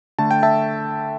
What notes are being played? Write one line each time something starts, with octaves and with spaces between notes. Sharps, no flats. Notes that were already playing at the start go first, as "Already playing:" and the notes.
D3 A3 A5
G5
E5 A5